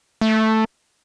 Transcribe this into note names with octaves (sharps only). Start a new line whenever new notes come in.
A3